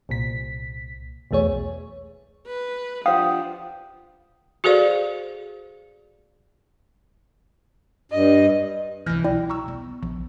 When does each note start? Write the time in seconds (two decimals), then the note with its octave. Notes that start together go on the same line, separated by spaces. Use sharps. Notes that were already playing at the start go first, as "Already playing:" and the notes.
0.09 C2 A#2 B6
1.31 B1 E2 A3 G#4 C#5
2.47 B4
3.06 F3 D4 G4 C5 F5 F#5 D#6
4.64 F#4 G#4 A4 C5 D5 F5
8.12 G2 D#5
9.06 C2 E3 F6 G6 A#6
9.24 B1 F#3 E4 D5 G5
9.49 A#5 C#6 E6
9.68 B3
10.03 A#1